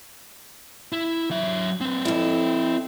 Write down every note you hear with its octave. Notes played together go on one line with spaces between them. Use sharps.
E4
F#3 E5
C4 B4
F2 E4